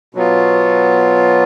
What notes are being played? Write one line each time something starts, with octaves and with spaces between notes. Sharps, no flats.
B2 F#3 B3 F4